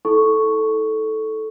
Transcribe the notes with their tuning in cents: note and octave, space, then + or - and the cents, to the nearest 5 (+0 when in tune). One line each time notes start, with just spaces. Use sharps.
E4 -40 A4 -10 C#6 +0